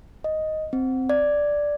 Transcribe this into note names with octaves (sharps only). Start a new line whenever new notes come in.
D#5
C4
D5